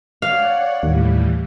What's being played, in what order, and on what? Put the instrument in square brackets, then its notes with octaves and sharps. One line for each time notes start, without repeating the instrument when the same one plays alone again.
[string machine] C#5 D5 F#5 [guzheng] F5
[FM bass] D#2 [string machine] A2 E3 G3